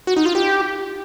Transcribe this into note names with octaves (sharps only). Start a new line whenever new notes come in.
F#4
D#4
F4
G4